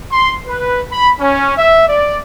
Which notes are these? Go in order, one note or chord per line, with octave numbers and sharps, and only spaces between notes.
C6
B4
B5
C#4
E5
D5